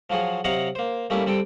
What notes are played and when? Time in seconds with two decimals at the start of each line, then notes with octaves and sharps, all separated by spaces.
0.10 F3 F#3 F4 F#4 G#4
0.44 C3 F#3 D#5 F5 F#5 A#5
0.75 A#3 C5
1.10 G3 A3 A#3 C#4 E4
1.26 G3 C4 A4 G5